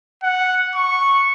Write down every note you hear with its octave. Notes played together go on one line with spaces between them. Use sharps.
F#5
C#6